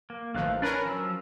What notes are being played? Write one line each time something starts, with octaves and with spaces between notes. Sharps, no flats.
A#3
A1 D#3 F3 A3 F5 F#6
C#4 D4 A#4 B4
F3 F#3 E6